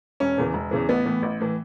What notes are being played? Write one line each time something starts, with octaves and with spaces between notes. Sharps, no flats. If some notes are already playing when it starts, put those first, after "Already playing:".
E1 C#4
E2 C#3 E3
E1
E2 C#3 E3
A1 B3
A2 E3
A1
A2 E3